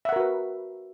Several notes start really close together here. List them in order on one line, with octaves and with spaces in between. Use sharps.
E5 F#5 A#4 F#4 B4